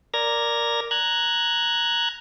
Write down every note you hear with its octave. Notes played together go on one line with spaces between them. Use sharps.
A#4 D5 A#5 G#6 A#6
A#5 F#6 G#6